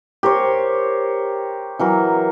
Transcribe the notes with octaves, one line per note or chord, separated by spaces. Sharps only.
G4 A#4 C5 C#5
E3 F#3 A#4